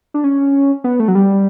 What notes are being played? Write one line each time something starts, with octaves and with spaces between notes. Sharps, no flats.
D4
C#4
B3
A3
F#3
G3